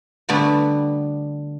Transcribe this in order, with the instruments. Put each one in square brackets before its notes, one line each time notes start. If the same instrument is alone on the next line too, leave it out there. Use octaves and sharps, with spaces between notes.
[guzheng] D3 G3 A3 B3 F#4